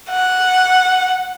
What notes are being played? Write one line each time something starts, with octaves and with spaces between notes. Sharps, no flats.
F#5